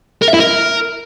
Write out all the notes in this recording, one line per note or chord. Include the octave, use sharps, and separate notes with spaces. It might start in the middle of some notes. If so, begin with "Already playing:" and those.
A#4
E5
E4
A#4